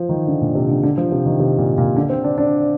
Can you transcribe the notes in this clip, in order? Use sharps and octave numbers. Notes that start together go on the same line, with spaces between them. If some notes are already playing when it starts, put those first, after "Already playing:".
Already playing: F3
D#3
D3
A#2
C3
D3
D3
F3
C3
D#3
C3
A#2
A#2
D3
C4
D4
D4